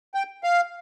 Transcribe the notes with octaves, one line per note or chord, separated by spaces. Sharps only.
G5
F5